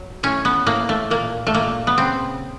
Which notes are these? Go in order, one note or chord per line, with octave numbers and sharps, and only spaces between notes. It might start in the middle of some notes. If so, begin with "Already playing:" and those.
Already playing: F#3
A2 C#4
B3
A2 A#3
A3
A#2 A#3
A3
A#2 A#3
B3
C#3 C4